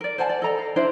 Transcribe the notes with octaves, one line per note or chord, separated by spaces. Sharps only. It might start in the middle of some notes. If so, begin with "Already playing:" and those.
A#4 D5
C5 F#5 G#5 A5
D5
A4 D#5 A#5
F5
D4 E4 C5 E5